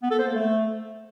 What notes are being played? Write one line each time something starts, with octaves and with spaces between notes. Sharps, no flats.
B3
A4
C5
A#3
A3